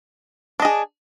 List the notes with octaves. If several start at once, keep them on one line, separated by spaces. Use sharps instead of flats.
D4 G#4 D#5